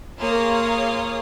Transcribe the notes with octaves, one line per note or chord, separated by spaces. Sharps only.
A#3 F4 G#4 C#5 F5 D#6